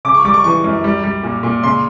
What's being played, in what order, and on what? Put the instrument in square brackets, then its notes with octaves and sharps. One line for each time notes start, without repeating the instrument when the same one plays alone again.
[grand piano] C#3 D6
C#6
G3 D6
C#6
E3 C#6
F#2
G3
G3
A#2
A#2
C#3 C6